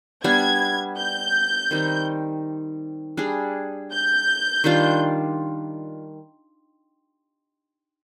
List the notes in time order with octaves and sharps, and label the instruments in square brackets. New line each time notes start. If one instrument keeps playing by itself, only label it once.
[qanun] G3 B3 D4 [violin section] G#6
[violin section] G6
[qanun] D#3 G3 C4 D#4
G3 D4 G#4
[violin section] G6
[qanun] D#3 G3 D4 F4